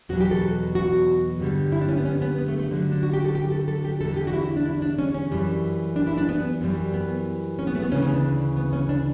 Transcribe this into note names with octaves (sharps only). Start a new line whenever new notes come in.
E2 B2 F#3 F#4
G4
A4
F#4
G2 D3 G3
E4
D4
C#4
B3
C#4
B3
B3
A3
A3
G2 D3 F#3
D4
F#4
G4
A4
G4
A4
A4
G4
E2 D3 G3 A4
G4
F#4
E4
D4
E4
D4
C#4
C#4
F#2 E3 G3
D4
E4
D4
B3
F#2 E3 G3
B3
C#4
B3
A3
B3
D2 C#3 E3 C#4
B3
D4
B3
C#4
D4